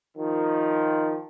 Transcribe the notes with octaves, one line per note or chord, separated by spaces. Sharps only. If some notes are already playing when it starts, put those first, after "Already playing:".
D#3 F3